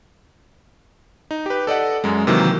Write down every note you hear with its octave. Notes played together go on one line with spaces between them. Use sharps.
D#4
G4 B4
A4 D5 D#5 F#5
F#2 G#3
C3 D#3 E3 F#3 A#3